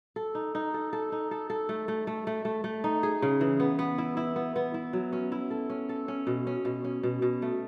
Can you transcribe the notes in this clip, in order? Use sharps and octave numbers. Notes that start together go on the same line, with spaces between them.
A4
D#4
D#4
A4
A4
D#4
A4
A4
A3
A3
A3
A3
A3
A3
D#4
G#4
C#3
E3
B3
B3
E4
E4
B3
B3
E4
F#3
C#4
E4
A4
C#4
A4
C#4
B2
C#4
B2
C#4
B2
B2
A3